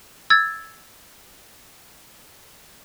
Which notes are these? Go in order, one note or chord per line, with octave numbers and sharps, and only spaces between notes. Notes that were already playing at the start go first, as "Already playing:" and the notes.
E6 G#6 A6